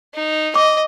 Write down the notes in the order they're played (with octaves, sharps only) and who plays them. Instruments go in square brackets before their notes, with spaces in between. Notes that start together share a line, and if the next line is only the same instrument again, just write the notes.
[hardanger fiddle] D#4
[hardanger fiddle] D#5 [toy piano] D6